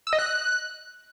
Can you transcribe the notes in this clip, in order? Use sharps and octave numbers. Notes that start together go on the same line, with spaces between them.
E6
D#5
F#6